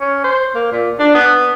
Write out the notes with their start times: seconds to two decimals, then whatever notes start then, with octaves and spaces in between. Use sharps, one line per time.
0.01 C#4
0.24 C5
0.55 A#3
0.72 A#2
0.99 D4
1.15 B3